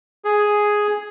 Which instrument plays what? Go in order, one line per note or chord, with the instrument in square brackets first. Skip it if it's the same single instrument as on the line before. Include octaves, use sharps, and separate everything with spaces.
[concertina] G#4